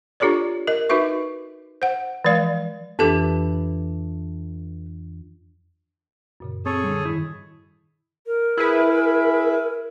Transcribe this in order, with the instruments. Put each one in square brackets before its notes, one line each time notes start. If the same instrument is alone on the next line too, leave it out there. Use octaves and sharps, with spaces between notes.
[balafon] D4 F4 G4 A4 C#5 D5
A#4 D#5
D#4 F#4 B4 E5 C#6
C5 F#5
E3 F3 G#3 D5 F5
[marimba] F2 E3 D4 [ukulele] G4 A4 B4
[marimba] F#2 A#2 C#3
[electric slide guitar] C4 [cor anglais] G#4 [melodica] A4 C#5
[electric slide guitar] D3 G3
[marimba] G#2 D#3 [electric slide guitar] E4
[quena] A#4
[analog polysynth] E4 G#4 B4